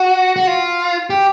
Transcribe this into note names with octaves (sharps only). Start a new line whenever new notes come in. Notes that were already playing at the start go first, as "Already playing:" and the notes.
Already playing: F#4
F#4
F4
G4